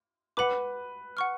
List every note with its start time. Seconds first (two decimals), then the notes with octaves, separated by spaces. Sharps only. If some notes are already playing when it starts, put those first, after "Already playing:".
0.37 B4 F#5 B5 D6
1.17 F#5 C#6 F6